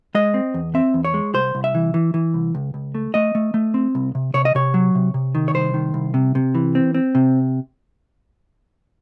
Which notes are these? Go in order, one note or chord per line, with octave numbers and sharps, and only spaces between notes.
G#3 D#5
C4
E2
C4 E5
E2
C#5
G#3
C2 C5
C2
E5
E3
E3
E3
C2
C#2
C#2
A3
A3 D#5
A3
A3
C4
C2
C3
C3 C#5
D#5
C3 C#5
F#3
C3
C3
D#3
C#5
C2 C5
D#3
C2
C3
C3
E3
C4
C4
C3